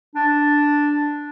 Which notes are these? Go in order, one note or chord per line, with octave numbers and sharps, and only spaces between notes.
D4